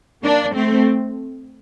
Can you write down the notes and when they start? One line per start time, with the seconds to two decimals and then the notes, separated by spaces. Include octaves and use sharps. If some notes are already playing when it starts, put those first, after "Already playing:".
0.23 A#3 D4
0.54 A3 C4